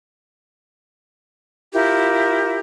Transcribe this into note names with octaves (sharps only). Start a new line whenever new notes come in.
E4 F4 G4 A#4